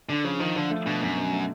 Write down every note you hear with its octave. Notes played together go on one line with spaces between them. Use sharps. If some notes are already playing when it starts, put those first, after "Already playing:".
D3 D4
C#3 F3
D#3 F3
D3 F3
A3
B2 D4
F#2 B2
B2
A3